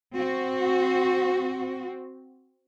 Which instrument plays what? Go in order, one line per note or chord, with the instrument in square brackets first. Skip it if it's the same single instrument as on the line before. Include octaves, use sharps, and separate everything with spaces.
[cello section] C4 F#4